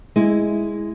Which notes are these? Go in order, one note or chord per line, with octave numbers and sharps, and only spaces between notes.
G#3 E4